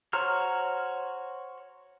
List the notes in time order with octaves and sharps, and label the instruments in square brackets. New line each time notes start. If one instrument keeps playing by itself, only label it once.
[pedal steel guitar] F#4 C5 C#5 A#5 F6